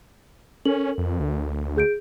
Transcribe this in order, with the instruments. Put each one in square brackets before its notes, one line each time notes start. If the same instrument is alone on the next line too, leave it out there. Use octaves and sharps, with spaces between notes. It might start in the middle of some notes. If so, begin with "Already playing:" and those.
[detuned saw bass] C#4 [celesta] A4 A#4 F#7
[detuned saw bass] F2
D2
[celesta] G#4 G6 D7